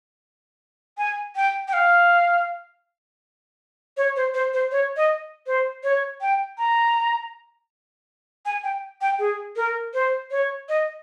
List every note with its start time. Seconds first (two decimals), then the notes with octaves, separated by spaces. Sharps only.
0.98 G#5
1.36 G5
1.68 G5
1.73 F5
3.97 C#5
4.16 C5
4.34 C5
4.53 C5
4.72 C#5
4.97 D#5
5.47 C5
5.84 C#5
6.21 G5
6.58 A#5
8.45 G#5
8.63 G5
9.01 G5
9.19 G#4
9.56 A#4
9.94 C5
10.31 C#5
10.69 D#5